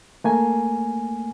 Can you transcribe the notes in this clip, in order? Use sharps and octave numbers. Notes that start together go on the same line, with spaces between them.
A3 A#3 G#5